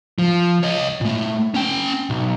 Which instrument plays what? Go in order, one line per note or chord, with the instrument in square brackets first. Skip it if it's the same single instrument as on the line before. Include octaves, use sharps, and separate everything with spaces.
[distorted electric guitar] F3
C#5 D#5
A#2 A3
C#4 G5
B1